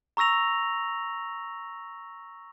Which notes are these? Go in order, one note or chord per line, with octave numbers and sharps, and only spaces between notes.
A#5 C#6 E6 A#6 F7